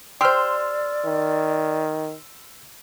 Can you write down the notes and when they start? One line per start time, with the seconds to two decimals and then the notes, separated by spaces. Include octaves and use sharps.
0.21 G4 C5 D5 C6 E6 F6
1.05 D#3